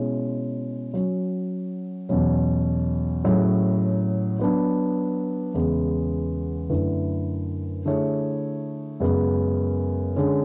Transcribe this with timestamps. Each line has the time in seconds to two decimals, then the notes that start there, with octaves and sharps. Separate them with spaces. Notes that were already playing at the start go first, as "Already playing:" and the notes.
Already playing: B2 G#3 C#4 E4
0.94 F#3 C#4 F#4
2.09 E2 B2 F#3 C#4
3.24 A2 F#3 C#4 G#4
4.39 F#3 B3 D4
5.54 E2 C#3 G#3 B3
6.69 F#2 D3 A3 E4 B4
7.85 D3 A3 E4 G#4 C#5
9.00 F#2 C#3 G#3 B3
10.15 D3 G#3 C#4 G#4